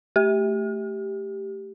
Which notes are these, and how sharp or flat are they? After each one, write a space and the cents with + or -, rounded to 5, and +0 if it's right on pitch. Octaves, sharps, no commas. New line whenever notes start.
A3 +0 G4 +0